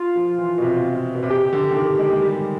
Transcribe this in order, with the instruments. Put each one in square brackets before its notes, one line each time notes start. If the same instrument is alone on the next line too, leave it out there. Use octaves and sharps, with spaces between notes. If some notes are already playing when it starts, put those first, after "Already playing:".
Already playing: [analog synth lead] F4
[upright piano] F3
E3
B2
C3
B2
C3
[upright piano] C#3 [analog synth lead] G4
[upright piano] D3
D3
D#3
G#3
G#3
G3